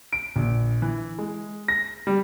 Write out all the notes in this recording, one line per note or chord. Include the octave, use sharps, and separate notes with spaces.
D7
A#1
E3
G#3
A#6
G3